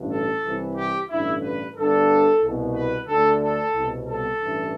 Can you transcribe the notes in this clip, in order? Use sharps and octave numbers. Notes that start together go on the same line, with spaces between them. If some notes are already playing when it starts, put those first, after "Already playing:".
Already playing: A1 G2 D3
A4
C2 C3 E3
G4
A1 G2 D3 E4
B4
G1 G2 D3 A4
C2 B2
B4
D2 D3 A4
A4
C2
B2
A4
A1 G2 E3